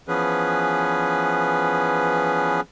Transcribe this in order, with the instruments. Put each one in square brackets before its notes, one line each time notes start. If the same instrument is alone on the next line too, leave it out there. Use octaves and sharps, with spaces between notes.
[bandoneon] E3 F3 B3 C#4 G#4 B4